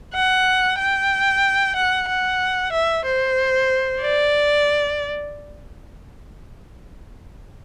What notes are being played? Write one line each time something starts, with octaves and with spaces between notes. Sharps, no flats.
F#5
G5
F#5
F#5
E5
C5
D5